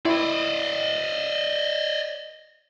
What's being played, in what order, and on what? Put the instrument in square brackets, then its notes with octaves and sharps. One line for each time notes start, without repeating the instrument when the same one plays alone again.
[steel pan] E4 [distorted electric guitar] D5 D#5